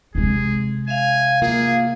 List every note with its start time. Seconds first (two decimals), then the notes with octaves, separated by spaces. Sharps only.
0.15 C3 G#3 G#4
0.88 E5 F5 G#5
1.42 A#3 F4 G#4